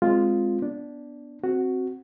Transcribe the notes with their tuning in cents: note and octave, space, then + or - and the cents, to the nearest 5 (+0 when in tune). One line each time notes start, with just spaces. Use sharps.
G#3 +0 C4 +0 F4 +0
B3 +0 D4 -5
C4 +0 F#4 +0